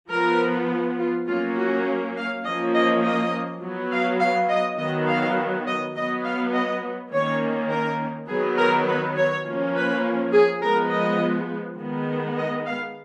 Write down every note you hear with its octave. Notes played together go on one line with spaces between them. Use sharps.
F3 B3 A#4
F4
F#3 A#3 C#4 F4
F#4
F5
F3 A#3 C#4 D#5
D#5
D#5
F#3 B3
F5
F5
D#5
D#3 F#3 B3 D#5
F5
D#5
F#3 B3 D#5
F5
D#5
D#3 A#3 C#4 C#5
A#4
D#3 F#3 B3 G#4
A#4
B4
C#5
F3 A#3 C#4
B4
G#4
F3 G#3 B3 A#4
D#5
D#3 G#3 B3
D#5
F5